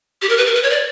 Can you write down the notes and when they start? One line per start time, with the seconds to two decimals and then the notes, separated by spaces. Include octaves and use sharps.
0.22 G4
0.29 A#4
0.38 B4
0.47 A#4
0.55 B4
0.63 C#5
0.70 D5